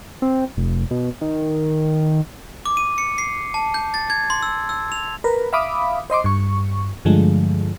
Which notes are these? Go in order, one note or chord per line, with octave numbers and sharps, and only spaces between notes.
C4
F1
B2
D#3
D6
D#7
C#7
C7
A5
G6
A6
G#6
C6
E6
E6
F7
A#4 B4
E5 F5 B5 D6 D#6
C5 D#5 C6 D6
G2 C#6
G2 D3 F3 G#3 A3